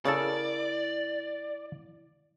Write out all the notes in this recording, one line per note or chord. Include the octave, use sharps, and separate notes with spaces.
C#3 E4 A4 A#4 C#5 D5